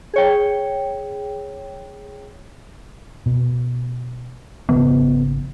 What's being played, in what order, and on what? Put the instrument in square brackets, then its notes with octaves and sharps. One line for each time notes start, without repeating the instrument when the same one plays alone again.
[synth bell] G#4 C#5 G5
[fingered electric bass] B2
[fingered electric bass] G#1 C#3 F3 [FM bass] B3